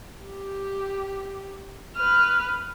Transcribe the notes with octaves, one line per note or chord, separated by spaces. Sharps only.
G4
B4 F6